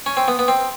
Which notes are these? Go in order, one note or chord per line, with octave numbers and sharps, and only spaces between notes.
C#4
C4
B3
B3
C4